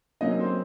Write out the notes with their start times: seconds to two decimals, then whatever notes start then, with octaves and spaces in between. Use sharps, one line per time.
0.21 C3 F#3 A#3 C#4 D#4 D#5
0.39 C4 C5